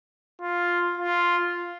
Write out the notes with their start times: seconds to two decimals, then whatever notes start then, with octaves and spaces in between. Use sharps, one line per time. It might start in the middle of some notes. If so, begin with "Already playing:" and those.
0.41 F4
0.97 F4